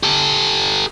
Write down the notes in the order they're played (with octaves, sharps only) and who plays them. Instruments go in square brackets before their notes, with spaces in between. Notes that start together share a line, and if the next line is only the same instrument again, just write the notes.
[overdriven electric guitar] G4 A4